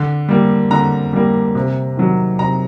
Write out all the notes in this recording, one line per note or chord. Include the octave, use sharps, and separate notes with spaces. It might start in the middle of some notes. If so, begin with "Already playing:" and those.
Already playing: D3
G3 A#3
D3 A#5
G3 A#3
C3
D#3 F#3
C3 A#5